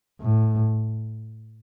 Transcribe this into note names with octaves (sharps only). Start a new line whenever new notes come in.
A2